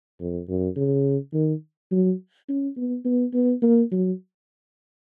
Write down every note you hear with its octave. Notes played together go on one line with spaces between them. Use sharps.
F2
F#2
C#3
D#3
F#3
C#4
B3
B3
B3
A#3
F#3